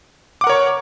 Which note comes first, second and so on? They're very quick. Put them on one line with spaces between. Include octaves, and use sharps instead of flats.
D6 F#5 A#4 C#5 C#6